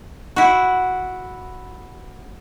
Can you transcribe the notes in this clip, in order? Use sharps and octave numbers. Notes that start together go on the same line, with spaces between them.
E4 F#4